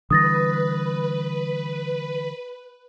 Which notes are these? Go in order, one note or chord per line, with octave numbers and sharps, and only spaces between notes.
D3 E3 G3 B4 D#6 A6 A#6